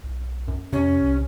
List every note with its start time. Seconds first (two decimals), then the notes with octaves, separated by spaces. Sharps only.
0.03 B1
0.48 F#2
0.73 F2 C3 C#4
1.02 C2